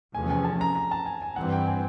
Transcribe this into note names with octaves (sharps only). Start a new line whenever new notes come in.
E2 C3 F3 A3 C#4 G#5
G#5
A5
A#5
A#5
A5
G#5
G#5
G2 E3 G3 C4 F#5
G5
G#5